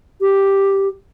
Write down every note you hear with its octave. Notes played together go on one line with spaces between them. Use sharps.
G4